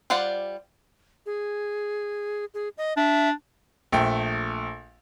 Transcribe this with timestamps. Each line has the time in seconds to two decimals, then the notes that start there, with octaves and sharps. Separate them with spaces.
0.10 G3 F4 C5 D5 F#5
1.26 G#4
2.54 G#4
2.78 D#5
2.97 D4 E5
3.92 A#1 A3 G5